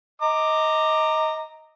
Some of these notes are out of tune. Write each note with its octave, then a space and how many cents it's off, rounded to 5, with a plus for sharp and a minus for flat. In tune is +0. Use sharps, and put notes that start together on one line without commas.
D#5 +15 A#5 -15 D6 +15